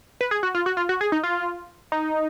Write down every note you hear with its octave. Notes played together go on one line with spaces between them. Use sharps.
B4
G#4
F#4
F4
F#4
F4
F#4
G#4
D#4
F4
D#4